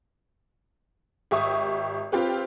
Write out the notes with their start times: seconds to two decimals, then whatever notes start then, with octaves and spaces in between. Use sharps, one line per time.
1.31 G#1 G4 E5 C#6 D#6
2.12 C4 F4 G4 B4